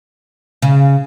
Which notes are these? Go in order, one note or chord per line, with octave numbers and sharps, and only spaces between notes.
C#3